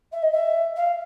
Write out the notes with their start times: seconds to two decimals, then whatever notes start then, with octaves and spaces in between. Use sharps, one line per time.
0.12 E5
0.22 D#5
0.32 E5
0.76 F5